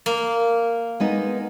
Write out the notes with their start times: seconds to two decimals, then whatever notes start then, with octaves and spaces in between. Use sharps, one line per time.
0.06 A#3
1.00 G#3 B3 D#4